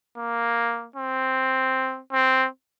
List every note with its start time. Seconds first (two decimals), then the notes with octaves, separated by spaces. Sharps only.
0.18 A#3
0.96 C4
2.13 C4